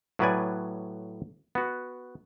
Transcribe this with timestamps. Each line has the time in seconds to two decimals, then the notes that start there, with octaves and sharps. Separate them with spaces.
0.19 A2 F#3 B3 B4 D5 G#5
1.55 B3 F#4